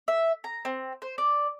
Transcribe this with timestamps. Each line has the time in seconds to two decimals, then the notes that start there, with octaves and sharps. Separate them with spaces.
0.08 E5
0.44 A#5
0.65 C4
1.02 C5
1.18 D5